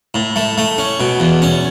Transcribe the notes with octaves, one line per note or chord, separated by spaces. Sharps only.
A2
A3
A3
C#4
B2
E2
C#4